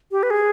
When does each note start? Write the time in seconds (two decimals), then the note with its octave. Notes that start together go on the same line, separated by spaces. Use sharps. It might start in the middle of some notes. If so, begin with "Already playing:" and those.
0.11 G4
0.23 B4
0.30 G#4